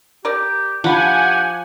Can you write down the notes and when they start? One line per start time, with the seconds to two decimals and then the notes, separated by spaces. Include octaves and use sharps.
0.25 G4 A#4 D5
0.84 F3 D4 G4 F#5 G#5 B5